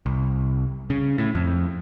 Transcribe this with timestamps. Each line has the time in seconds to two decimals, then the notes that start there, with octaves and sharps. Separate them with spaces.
0.06 C2
0.90 C#3
1.18 A2
1.35 F2